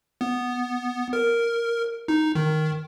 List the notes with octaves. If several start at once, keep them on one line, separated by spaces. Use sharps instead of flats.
B3
A#4
D#4
D#3